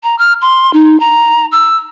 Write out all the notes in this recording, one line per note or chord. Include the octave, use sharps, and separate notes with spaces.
A#5
F6
C6
D#4
A#5
E6